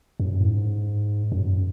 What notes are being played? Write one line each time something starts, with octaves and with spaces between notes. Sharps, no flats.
F#2
A2
G#2
F#2